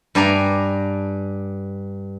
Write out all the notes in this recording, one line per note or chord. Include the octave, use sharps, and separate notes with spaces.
G2 D5 G#5 A#5